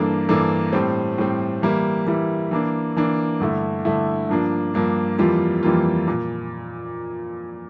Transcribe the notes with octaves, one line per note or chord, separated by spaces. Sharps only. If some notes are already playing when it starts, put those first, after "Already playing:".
Already playing: G2 E3 A#3 D4 A4
G2 E3 A#3 D4 A4
A2 G3 C4
A2 G3 C4
E3 G3 A#3 E4
E3 G3 A#3 E4
E3 A#3 D4
E3 A#3 D4
G2 D3 A3 E4
G2 D3 A3 E4
G2 F3 A#3 D4
G2 F3 A#3 D4
F2 E3 G3 A#3 F4
F2 E3 G3 A#3 F4
A#2